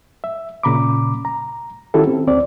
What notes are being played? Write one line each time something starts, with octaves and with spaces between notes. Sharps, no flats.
E5
A#2 C#3 A#5 B5 D6
A#5
D#3 C#4 E4 F#4 G4 A4
C4
D2 C4 D5